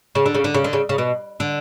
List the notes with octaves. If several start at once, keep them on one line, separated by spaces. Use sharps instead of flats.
C#3
D3
C#3
D3
C#3
D3
C#3
C#3
B2
D3